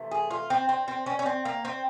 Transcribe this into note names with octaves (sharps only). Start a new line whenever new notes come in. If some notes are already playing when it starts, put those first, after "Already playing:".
Already playing: C3 E3 A3
G#4
F4
C4
C4
C4
C#4
C#4
C4
A#3
C4